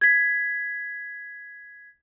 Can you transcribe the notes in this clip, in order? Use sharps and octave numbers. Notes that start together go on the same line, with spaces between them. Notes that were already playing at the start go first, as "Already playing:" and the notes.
G#6 B6